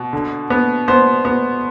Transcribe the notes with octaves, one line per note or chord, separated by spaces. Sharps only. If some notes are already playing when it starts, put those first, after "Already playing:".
Already playing: B2
D3
B3
B3 C5
B3